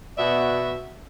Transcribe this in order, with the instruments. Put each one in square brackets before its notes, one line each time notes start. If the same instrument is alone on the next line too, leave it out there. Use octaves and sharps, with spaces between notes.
[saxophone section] B2 B3 F#4 D5 E5